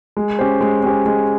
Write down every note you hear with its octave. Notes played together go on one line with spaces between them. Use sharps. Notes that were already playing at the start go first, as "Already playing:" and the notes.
G#3
C#4 G4 C5
G#3
C#4 G4 C5
G#3